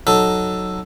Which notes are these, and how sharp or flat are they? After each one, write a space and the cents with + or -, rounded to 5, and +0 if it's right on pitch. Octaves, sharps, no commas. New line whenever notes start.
F#3 +0 D#4 +0 A4 +0